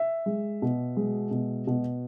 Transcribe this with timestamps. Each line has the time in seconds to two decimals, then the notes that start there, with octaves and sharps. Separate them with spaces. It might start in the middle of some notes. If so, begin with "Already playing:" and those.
Already playing: E5
0.26 G#3
0.62 B2
0.97 G#3
1.31 B2
1.67 B2